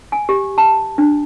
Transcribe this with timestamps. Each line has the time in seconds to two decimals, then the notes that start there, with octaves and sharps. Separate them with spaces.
0.12 G#5
0.29 G4
0.58 A5
0.98 D4